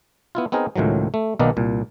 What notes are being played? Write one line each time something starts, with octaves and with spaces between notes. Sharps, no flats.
B3 E4 F4
B3 C4 D#4 G#4 A#4
C#2 A2 D#3 F3 F#3
A3
B1 D#3 A#3 B3 D#4 D5
C2 A#2